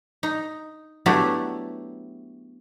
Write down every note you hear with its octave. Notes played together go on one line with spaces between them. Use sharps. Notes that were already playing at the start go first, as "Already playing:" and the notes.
D#4
F#3 A3 B3 D4 E4 G4